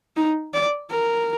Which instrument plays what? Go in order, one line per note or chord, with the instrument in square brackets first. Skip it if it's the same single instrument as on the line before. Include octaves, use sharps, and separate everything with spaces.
[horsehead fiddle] D#4
D5
A#4